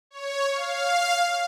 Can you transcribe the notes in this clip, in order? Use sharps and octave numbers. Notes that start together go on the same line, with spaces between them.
C#5
F5